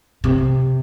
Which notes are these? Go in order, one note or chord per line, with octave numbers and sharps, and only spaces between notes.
C3